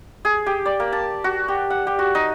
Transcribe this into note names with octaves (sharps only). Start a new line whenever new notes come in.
G#4
G4
D5
A#3
A5
F#4
G4
F#5
G4
F#4
D#4